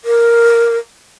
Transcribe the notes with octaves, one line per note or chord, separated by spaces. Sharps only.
A#4